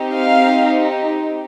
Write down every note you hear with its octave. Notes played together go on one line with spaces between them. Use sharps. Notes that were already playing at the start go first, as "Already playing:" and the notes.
Already playing: C4 D#4 G4
F5